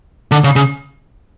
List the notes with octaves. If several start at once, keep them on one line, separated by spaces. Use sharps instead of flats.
D3
C#3
C#3